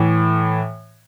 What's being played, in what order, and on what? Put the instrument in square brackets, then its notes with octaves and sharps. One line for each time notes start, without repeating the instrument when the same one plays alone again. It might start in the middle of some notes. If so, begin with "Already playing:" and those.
Already playing: [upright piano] A2 E3